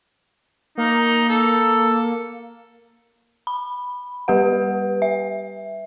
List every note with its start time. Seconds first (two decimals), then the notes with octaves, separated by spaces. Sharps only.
0.78 A#3 D#4
1.29 A4
3.47 B5
4.28 G3 G4 B4 F#5
5.02 E5